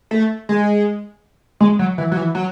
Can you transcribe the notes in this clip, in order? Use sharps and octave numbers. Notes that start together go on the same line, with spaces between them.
A3
G#3
G#3
F#3
E3
F#3
E3
F#3